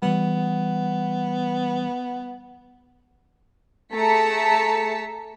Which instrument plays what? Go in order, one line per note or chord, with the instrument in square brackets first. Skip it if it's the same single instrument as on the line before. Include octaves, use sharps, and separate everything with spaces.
[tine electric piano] E3 G3 [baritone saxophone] B3
[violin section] A3 G#4 A5 A#5 B6 C#7